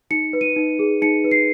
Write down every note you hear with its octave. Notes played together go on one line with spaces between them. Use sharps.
D#4 C#7
B4
D#7
D#4
G#4
D#4 C#7
B4
C7